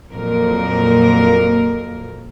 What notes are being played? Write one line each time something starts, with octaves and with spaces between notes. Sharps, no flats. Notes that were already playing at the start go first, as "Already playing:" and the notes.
F2 A#2 F#3 A#3 A#4